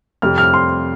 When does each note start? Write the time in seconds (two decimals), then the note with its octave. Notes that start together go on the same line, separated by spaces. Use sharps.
0.22 F2 C3 G3 F6
0.38 F6
0.54 C6